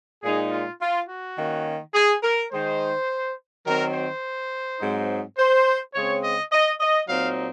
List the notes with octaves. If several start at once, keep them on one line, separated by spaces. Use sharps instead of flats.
A#2 G#3 D#4 G#4
F4
F4
F#4
D#3 A#3 C#4
G#4
A#4
D#3 G#3 D#4 C5
D#3 F#3 C4 A#4
C5
G#2 F#3 C4 D#4
C5
C#3 G#3 C4 C#5
D#5
D#5
D#5
A#2 F#3 C4 D#4 F5